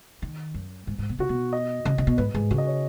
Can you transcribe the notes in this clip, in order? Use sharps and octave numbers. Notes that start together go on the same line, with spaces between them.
D#3
F#2
G#2
G#2
B2
C#3 F#4
B2
D#5
C#3
C#3
B2
G#2 B4
G#2 G#4
C#3 F#4
D#5
C#5